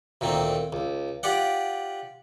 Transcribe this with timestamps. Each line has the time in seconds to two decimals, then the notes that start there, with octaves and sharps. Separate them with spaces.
0.21 D2 A#2 D#3 C4
0.73 C#2
1.23 F4 G4 D5 F#5